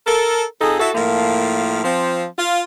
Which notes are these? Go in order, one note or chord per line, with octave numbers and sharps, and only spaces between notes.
A4 A#4
F2 D#4 G#4 A4
E4 F#4 A4
A2 F3 A#3
F3 C4
F4